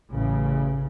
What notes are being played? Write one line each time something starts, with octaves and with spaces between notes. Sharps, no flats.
A1 C#3